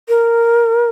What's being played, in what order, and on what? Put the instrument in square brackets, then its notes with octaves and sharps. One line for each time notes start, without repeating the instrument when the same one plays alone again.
[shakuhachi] A#4